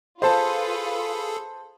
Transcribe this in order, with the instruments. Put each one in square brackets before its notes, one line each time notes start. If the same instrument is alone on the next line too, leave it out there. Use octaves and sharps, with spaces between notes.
[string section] F4 B4 [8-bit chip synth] G#4 A4 [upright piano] C5 A5